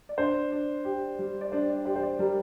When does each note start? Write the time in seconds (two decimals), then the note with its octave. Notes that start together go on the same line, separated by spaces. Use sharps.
0.09 D5
0.18 D4 C5
0.52 D4
0.85 G4
1.19 G3
1.41 D5
1.52 D4 C5
1.69 D5
1.85 G4 C5
1.96 C5
2.03 D5
2.19 G3 A#4